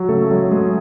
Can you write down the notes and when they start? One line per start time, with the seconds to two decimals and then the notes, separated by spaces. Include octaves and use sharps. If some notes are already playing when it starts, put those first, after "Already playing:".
Already playing: F#3
0.09 C#3 A3 A4
0.31 F#3 G#3 G#4
0.51 G#3 A3 G#4